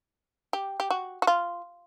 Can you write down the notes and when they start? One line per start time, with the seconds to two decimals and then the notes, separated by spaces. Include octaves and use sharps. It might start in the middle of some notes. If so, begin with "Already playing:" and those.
0.53 G4
0.80 G4
0.90 F#4
1.22 F#4
1.27 F4